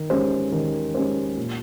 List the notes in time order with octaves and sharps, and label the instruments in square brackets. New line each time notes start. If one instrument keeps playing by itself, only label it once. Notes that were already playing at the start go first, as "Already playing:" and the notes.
Already playing: [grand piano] D#3
G#3 C#4 G4 C5
D#3
G#3 C#4 G4 C5
A#2